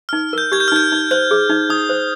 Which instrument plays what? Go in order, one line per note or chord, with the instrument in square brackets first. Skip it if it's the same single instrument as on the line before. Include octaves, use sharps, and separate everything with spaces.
[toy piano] D#4 [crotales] F6
[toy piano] A#4 [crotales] G6
[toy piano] G4 [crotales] G#6
[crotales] G6
F6
[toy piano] D#4 [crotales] G6
[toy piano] D#4
[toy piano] C5 [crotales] G6
[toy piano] G#4
D#4
[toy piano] D#4 [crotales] D#6
[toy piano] C5